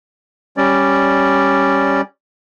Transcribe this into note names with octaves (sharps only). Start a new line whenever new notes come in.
G3 C#4 D5